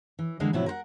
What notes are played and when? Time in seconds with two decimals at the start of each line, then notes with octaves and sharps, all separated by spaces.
0.19 E3
0.40 D3 E3 G3 G#3 A#3
0.53 A2 C3 F3 F#3 B3 E4
0.66 A#4 C5 F#5